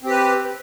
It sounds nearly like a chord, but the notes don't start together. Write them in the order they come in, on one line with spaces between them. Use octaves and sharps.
C4 G4 B4